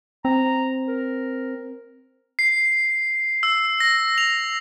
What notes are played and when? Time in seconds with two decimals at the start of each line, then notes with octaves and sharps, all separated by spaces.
0.25 C4 A#5
0.88 A#4
2.39 C7
3.43 E6
3.80 A#6
4.18 F7